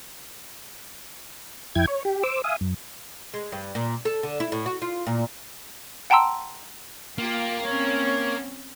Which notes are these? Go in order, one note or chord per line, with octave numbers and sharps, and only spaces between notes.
F2 E4 G5 G#6
C#5
G4
C5 D6 E6
E5 F5 G#5 D#6
F#2
G#3
G2
A#2
A4
D3
E4
A2
F#4
F4
A#2
F#5 G5 A5 A#5 C6 E6
A#3 F4 G4
C4 C#4 C#5